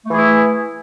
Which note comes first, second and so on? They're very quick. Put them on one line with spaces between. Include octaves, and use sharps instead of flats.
A3 E3 G#4 E4